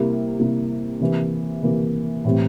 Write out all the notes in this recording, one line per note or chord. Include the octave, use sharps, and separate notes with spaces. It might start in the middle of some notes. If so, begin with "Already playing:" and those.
Already playing: C3 G3 A#3 E4
C3 G3 A#3 E4
C3 E3 A#3
C3 E3 A#3
A2 E3 G3 C4